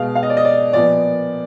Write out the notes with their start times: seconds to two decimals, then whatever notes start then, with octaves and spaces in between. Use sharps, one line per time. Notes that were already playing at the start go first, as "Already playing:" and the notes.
Already playing: B2 G#3 B3 F5
0.15 F5
0.23 D#5
0.30 D5
0.37 D#5
0.45 D5
0.73 A#2 F3 B3 D5